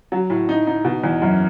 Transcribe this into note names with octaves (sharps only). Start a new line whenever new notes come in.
F#3
A2
D#4
D#4
B2
E2
F#2